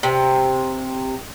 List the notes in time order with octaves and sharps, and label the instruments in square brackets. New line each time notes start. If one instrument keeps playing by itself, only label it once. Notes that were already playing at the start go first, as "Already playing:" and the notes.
[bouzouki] C3